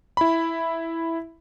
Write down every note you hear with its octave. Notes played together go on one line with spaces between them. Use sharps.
E4 B5